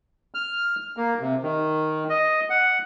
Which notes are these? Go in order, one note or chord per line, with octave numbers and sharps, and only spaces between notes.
F6
A#3
C3
D#3
D#5
F#5